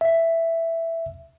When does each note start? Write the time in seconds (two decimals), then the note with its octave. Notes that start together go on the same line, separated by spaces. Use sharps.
0.01 E5